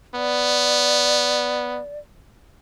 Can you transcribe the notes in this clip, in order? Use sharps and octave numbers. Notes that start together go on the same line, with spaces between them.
B3 D5